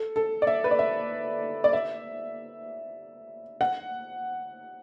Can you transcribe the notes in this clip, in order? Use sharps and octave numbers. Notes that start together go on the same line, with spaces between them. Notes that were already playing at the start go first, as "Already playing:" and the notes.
Already playing: A4
A4
D5
E5
B4
D5
E5
D5
E5
F#5